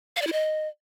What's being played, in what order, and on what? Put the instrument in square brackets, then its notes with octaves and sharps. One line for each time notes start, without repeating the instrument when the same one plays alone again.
[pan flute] F5
D5
E4
D#5